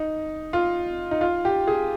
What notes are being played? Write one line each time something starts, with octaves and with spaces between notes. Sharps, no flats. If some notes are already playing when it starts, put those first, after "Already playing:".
Already playing: D#4
F4
D#4
F4
G4
G#4